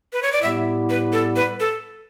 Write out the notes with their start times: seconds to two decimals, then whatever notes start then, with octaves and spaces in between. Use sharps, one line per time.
0.13 B4
0.23 C#5
0.32 D5
0.42 A2 G3 B3 E4 G4 E5
0.90 B4
1.13 A4
1.36 B4
1.60 A4